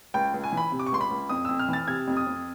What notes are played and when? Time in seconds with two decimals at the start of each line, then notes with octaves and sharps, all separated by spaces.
0.14 C#2 G5
0.34 C#2
0.44 G#5
0.52 E3 B5
0.72 C3
0.80 D6
0.87 C#6
0.92 C#2 C6
1.01 B5
1.11 C#2
1.29 F2 D#6
1.45 F2 E6
1.59 F6
1.68 E3 A6
1.88 C3 G#6
2.07 F2
2.17 D#6
2.27 F2